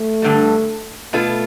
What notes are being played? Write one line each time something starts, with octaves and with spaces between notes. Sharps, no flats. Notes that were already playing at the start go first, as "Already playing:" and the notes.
Already playing: A3
G2 D3 G3
B2 A3 B3 F4 A4